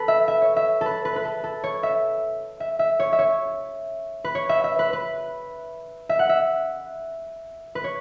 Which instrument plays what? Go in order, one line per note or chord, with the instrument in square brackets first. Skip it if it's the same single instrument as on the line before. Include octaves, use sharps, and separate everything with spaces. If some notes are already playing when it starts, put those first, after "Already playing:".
Already playing: [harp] A4 B4
E5
E5
C#5
E5
A4 B4
B4
B4
A4
A4
C#5
E5
E5
E5
C#5
E5
C#5
B4
C#5
E5
E5
B4
B4
E5
F#5
E5
B4
C#5